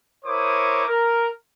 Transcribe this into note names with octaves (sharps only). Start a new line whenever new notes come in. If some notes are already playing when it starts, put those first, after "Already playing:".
E4 A#4 C5 C#5 D6 D#6
A#4